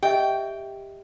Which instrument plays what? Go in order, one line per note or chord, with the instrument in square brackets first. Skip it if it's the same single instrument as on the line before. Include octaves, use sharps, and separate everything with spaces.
[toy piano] G4 D#5 E5 [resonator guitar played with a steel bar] G5